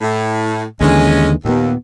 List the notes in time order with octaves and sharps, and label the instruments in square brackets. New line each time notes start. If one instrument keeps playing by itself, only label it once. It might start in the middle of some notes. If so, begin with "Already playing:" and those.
[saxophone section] A2
[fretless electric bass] D#2 D3 E3 [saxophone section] G#3 C#4
[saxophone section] D#2 [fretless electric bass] A#2 B3